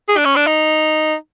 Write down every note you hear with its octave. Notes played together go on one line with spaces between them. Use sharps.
G#4
D4
C#4
D4
D#4